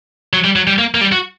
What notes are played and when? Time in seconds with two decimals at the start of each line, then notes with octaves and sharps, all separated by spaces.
0.33 F#3
0.44 G3
0.56 F#3
0.67 G3
0.78 A#3
0.95 A#3
1.01 G3
1.12 F#4